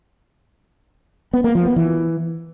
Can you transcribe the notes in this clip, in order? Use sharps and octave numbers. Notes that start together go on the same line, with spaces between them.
B3
A#3
F3
B3
E3